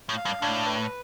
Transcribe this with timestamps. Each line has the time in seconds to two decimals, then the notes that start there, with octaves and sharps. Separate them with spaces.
0.09 A2
0.17 F5
0.25 G2
0.41 A2 D4
0.66 B4